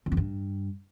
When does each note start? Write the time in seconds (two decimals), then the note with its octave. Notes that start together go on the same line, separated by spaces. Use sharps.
0.06 F2
0.12 C#3
0.17 G2